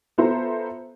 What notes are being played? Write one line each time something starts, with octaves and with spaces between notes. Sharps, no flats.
B3 F4 A4 C5 E5 A#5